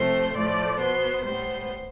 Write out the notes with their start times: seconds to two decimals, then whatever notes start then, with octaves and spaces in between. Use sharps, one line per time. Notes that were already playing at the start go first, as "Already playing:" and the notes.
Already playing: C3 F3 A3 C5
0.35 A2 F3 A3 D5
0.80 B2 B3 C5
1.24 A2 G3 B3 C5